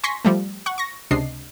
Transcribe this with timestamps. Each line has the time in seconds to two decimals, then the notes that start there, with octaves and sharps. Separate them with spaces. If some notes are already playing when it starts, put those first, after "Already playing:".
0.04 G#5 C6 C#6 A#6 B6
0.25 F3 G3 A3
0.66 F#5 C#6
0.78 C#6 A#6
1.11 C#2 C3 D4 D#5 C7